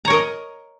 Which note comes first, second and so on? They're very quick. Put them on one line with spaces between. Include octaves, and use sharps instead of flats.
A#5 C#5 A#4 D#5